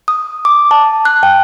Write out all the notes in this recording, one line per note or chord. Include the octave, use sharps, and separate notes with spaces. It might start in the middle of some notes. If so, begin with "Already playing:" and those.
D#6
D6
A5
F#6
G5